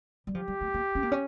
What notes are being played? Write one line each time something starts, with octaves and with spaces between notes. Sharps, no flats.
G3
F3 G4
G3
A3
A#3
C#4
A#3
C#4